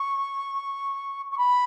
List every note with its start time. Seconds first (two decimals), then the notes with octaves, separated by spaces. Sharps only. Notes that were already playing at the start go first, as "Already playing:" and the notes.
Already playing: C#6
1.31 C#6
1.38 B5